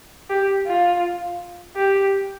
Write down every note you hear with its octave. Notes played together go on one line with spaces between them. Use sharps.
G4
F4
G4